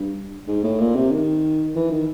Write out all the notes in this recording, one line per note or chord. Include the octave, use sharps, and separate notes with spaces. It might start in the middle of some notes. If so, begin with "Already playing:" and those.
Already playing: G2
G#2
A2
A#2
C3
D#3
E3
D#3